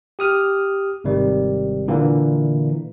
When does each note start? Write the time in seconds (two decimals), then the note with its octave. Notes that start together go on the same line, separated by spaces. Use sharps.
0.19 G4 D#6 F6
1.04 G#1 C3 D#3 G3
1.88 A#2 D3 E3 A#3